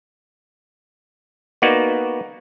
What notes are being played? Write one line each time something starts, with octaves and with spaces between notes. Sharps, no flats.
A#3 B3 D#4 F#4 D5